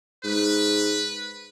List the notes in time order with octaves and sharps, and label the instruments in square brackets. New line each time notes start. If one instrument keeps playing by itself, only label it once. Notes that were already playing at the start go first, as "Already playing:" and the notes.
[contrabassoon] G#2 [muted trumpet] B4